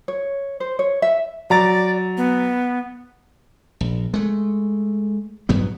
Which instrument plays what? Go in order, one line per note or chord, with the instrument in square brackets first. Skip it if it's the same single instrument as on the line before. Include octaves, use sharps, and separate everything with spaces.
[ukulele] C#5
C5
C#5
E5
[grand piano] F#3 A#5 A6 [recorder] D5
[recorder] B3
[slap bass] A#1
G#3 A3
A#1 G2 F#3 B3